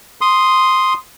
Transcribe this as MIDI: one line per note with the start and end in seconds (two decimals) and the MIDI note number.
0.21 0.94 84
0.21 0.94 87